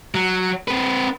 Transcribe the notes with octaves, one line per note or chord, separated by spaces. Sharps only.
F#3
C4 B4